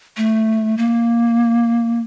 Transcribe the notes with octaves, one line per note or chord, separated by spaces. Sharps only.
A3
A#3